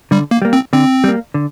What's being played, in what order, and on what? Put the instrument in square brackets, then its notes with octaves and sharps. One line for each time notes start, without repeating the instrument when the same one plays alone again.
[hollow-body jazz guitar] D3 [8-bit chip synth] G3
[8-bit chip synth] A#3
[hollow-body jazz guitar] G3 A#3
[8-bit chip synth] C4
[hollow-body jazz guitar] D3 [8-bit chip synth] C4
[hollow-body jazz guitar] G3 A#3
D3